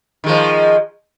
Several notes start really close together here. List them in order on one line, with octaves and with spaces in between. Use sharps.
D#3 G#3 F3